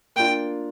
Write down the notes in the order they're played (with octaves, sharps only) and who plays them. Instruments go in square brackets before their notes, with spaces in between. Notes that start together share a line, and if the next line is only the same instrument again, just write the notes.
[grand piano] A#3 D4 F4 [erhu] G5